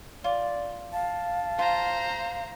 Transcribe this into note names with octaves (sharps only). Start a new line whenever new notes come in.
F4 D5
F5 A5
F4 C5 A#5